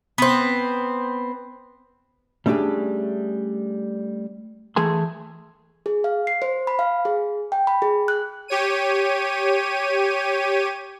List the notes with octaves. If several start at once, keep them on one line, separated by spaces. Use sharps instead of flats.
B3 C4
G3 A3 C#4 D4 G4 G#4
E3 A3 G#4 G#5 C6
G#4
F5
C7
C5
B5
F5
G#4
G5
B5
G#4
F#6
G4 C#5 D#7